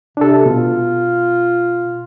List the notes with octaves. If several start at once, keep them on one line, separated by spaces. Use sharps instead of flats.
C3 D4 A4
B2 F4